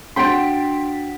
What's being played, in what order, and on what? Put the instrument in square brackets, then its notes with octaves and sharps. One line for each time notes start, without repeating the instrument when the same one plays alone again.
[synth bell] D4 B6 [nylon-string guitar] F#4 G5 [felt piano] C6 D7